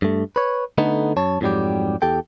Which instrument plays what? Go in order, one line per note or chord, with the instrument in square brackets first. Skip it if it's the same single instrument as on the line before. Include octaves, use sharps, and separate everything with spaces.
[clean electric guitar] G2 A3
B4 C#5
D3 A3 B3 D#4
F#2 C#5 A5
F2 G#2 F#3 G3 G4
E2 G4 A4 G5